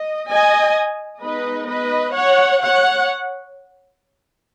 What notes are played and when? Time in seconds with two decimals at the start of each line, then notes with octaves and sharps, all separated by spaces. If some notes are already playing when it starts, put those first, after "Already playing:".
Already playing: D#5
0.30 D#5 G#5
1.22 G#3 B3 D#4 B4 D#5
1.69 B4 D#5
2.15 C#5 F#5
2.63 C#5 F#5